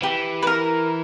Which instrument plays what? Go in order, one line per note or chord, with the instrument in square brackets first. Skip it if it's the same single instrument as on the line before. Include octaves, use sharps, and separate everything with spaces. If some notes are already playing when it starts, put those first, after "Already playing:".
[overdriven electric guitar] E3 [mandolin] G4
[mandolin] B4
A#4